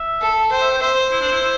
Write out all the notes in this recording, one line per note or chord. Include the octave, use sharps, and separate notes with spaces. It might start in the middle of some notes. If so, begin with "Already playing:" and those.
Already playing: E5
A4
C5 G5
E5
G5
C5 E5
E4
D4
E4
E4